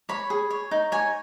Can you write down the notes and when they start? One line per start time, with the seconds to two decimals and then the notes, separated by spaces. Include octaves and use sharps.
0.09 C#5 B5
0.30 G#4
0.50 C#5
0.71 D#4
0.92 C#5 G#5